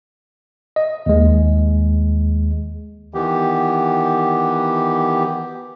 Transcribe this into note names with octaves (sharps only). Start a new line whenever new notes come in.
D#5
D#2 G#3
D#3 E3 B3 G4